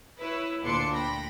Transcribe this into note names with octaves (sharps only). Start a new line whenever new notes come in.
E4 B4 C#5
D2 A#2 D4 C6 D6 C#7
G5 B5 A#6